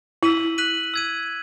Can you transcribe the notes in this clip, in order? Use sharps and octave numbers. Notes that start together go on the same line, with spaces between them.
E4 E6 B6 D#7 F#7
F#6 B6 D#7 F#7
E6 G#6 D#7